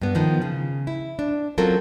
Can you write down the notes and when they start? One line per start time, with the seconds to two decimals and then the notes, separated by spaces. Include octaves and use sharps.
0.01 G2 B3
0.15 D#3 F3 B3
0.42 C#3
0.87 E4
1.19 D4
1.58 F#3 C4 C#4 F4 A4 A#4